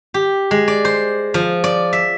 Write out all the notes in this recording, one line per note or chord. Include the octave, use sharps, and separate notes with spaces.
G4
G#3
D5
C5
F3
D5
E5